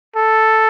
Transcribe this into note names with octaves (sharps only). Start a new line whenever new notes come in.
A4